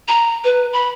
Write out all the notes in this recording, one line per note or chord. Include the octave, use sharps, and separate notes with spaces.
A#5
B4
B5